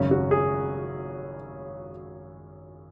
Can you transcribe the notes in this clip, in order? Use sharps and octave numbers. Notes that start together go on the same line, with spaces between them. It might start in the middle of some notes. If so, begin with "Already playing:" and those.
Already playing: G#1 F#2 C#3 C#4
F#4
G#4